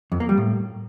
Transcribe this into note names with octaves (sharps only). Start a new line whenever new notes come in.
F2
A#3
G3
A2